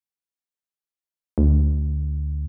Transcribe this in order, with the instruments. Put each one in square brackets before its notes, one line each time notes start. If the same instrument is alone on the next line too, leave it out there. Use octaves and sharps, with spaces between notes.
[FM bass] D2